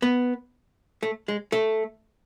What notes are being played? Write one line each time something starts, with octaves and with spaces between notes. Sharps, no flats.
B3
A3
G#3
A3